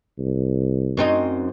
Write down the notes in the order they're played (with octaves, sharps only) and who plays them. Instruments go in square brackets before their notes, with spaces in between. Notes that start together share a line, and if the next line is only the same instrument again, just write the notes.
[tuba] C2
[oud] F#2 C4 D#4